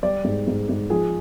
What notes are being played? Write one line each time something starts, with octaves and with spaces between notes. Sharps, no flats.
G3 D5
G#2
G#2
G#2
F3 G#4